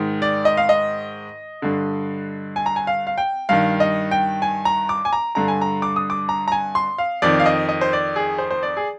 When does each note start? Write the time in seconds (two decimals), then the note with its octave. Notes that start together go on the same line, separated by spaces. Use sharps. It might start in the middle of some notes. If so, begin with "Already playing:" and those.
Already playing: G#2 D#3
0.22 D5
0.45 D#5
0.57 F5
0.69 D#5
1.62 G2 D3
2.56 G#5
2.66 A#5
2.76 G#5
2.87 F5
3.07 F5
3.18 G5
3.49 G2 D#3 F5
3.80 D#5
4.11 G5
4.42 G#5
4.65 A#5
4.89 D6
5.05 G#5
5.13 A#5
5.35 G2 D3 A#5
5.48 G#5
5.61 A#5
5.82 D6
5.96 D#6
6.10 D6
6.29 A#5
6.48 A#5
6.52 G#5
6.75 C6
6.98 F5
7.22 F2 D#3 D5
7.40 F5
7.46 D#5
7.69 D#5
7.81 C5
7.93 D5
8.16 G#4
8.38 C5
8.50 C5
8.63 D5
8.77 G#4